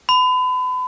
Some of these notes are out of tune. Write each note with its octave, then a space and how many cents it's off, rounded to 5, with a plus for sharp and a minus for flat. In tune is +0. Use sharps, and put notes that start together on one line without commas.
B5 +35